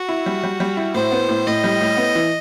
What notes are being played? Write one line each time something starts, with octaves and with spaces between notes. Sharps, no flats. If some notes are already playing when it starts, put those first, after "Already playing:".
Already playing: F#4
E4
G3
G3
G3
E4
A2 C5
B3
A2
A2 D#5
G3
A2
B3
E3